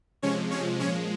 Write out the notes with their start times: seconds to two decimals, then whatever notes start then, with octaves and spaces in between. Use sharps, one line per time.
0.22 C3 F3 G#3 C#4 C#5
0.51 C3 F3 G#3 C#4 C#5
0.80 A#2 F3 G#3 C#4 C#5